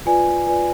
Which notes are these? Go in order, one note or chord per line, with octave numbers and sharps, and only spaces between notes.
F4 B4 D5 G#5
F4 B4 D5 G#5